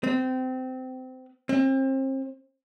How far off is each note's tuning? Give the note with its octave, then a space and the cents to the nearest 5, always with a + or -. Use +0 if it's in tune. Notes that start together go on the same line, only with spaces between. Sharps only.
C4 -25
C4 +35